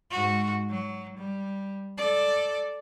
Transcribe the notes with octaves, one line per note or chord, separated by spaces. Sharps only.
G#2 F#4
F#3
G3
A4 D5